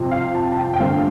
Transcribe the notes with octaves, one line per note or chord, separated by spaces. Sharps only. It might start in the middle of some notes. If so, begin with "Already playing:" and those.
Already playing: F2 C3 F3 C4
F5
A5
A5
G5
G5
G2 D3 A3 C4 F5